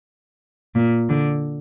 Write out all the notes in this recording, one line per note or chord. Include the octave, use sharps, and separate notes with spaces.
A#2
D3